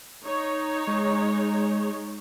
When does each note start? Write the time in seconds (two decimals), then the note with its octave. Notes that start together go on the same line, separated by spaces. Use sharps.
0.25 D#4 C#5
0.87 G#3